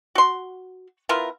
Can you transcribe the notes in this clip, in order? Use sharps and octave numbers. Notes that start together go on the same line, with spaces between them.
F#4 C6
B3 E4 F4 A#4